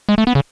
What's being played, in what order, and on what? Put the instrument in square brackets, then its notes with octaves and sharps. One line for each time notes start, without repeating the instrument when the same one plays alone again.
[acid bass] G#3
A3
B3
C#3